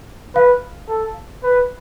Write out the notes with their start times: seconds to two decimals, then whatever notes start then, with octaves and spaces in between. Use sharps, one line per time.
0.35 B4 F5
0.89 A4
1.44 B4